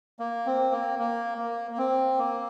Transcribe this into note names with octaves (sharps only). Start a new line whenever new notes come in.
A#3
C4
A#3
A#3
A#3
A#3
C4
A#3